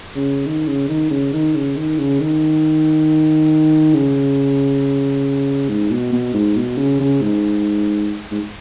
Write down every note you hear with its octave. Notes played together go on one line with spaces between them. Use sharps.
C#3
D#3
C#3
D#3
C#3
D#3
C#3
D#3
C#3
D#3
C#3
G#2
B2
B2
G#2
B2
C#3
C#3
G#2
G#2